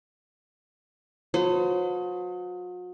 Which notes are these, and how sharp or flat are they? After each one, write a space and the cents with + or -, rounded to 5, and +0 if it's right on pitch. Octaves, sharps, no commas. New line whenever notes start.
F#3 -45 C5 -45